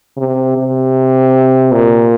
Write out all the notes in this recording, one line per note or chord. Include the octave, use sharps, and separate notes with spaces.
C3
C3
A#2